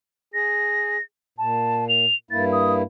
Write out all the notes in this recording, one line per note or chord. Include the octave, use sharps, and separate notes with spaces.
G#4 A#6
A#2 A5
F7
G2 A#3 E4 A6
D#6